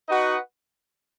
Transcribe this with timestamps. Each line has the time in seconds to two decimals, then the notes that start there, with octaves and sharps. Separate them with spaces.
0.08 D#4 F#4 B4 D#5 F#5